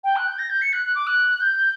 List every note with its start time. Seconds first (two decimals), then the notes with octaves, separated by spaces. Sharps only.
0.04 G5
0.16 F#6
0.27 G6
0.39 A#6
0.50 G6
0.61 C#7
0.73 F#6
0.85 F#6
0.95 D6
1.07 F#6
1.41 G6